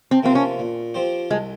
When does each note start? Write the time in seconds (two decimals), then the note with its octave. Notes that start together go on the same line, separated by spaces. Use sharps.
0.11 C4
0.23 C3 F3 A#3 C4 F4
0.35 C#4
0.59 A#2
0.94 F3 C4 G4 C5
1.31 C2 G#3